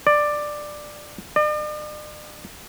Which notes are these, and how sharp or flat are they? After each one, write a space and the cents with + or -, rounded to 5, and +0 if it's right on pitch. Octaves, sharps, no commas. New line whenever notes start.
D5 +10
D5 +45